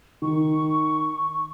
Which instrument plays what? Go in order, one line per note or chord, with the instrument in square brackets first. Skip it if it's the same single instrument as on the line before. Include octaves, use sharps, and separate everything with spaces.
[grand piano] D#3 [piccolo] C#6